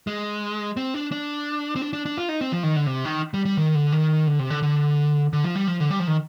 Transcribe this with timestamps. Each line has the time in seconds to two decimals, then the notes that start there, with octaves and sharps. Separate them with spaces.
0.07 G#3
0.77 C4
0.94 D4
1.12 D4
1.76 C4
1.82 D4
1.93 D4
2.06 D4
2.17 F4
2.29 D#4
2.41 C4
2.52 F3
2.63 D#3
2.76 D3
2.87 C3
3.05 D#3
3.34 G3
3.45 G3
3.57 D#3
3.75 D3
3.92 D#3
4.27 D3
4.39 C3
4.50 D3
4.63 D3
5.33 D3
5.44 F3
5.55 G3
5.67 F3
5.80 D3
5.91 G3
5.99 F3
6.08 D#3